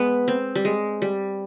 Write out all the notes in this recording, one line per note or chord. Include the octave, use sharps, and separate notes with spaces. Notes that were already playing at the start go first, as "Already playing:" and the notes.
Already playing: G#3 B3
C4
G3
G#3
G3